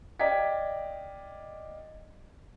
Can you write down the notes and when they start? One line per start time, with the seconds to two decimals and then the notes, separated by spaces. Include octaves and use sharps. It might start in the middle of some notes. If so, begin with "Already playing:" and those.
0.19 D5 D#5 F5 G5 G#6 B6